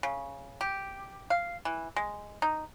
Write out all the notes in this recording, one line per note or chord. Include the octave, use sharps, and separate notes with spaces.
C#3
G4
F5
E3
G#3
D#4